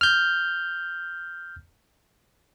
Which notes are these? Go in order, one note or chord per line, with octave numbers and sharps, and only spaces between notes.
F6 G6